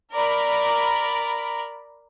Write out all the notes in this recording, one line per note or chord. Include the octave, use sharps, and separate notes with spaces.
A#4 D5 B5